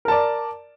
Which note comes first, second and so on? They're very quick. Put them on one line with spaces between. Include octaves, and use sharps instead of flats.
A#4 A5 D5